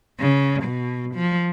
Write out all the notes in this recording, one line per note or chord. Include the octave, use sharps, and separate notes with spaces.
C#3
B2
F3